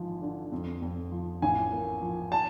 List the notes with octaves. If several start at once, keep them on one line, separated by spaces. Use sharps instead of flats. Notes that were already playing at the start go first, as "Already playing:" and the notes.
Already playing: G#1 E3 F3
D3
F2
F2
F3
A1 G#5
A#3
F3
A5